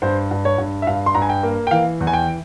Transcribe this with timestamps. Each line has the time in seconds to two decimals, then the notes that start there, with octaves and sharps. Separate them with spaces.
0.02 G2 C5
0.31 G2
0.45 C#5
0.58 G2
0.82 E5
0.87 G2 F5
1.06 C6
1.15 G2 A#5
1.22 G#5
1.29 G5
1.43 A#3
1.67 G5
1.71 E3 F5
2.01 E2
2.07 G#5
2.13 G5